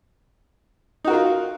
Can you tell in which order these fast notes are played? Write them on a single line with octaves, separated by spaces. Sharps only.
D#4 F#4 A#4 F4